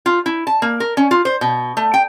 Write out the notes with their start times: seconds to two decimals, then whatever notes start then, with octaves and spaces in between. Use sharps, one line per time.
0.06 F4
0.26 E4
0.47 A5
0.62 A#3
0.80 A#4
0.97 C#4
1.11 F4
1.25 C5
1.41 B2
1.77 A3
1.94 G5